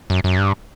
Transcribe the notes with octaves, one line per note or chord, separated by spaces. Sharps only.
F#2
F#2
G2